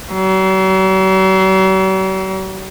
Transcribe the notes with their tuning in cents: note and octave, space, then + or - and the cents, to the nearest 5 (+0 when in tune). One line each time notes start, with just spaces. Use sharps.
F#3 +45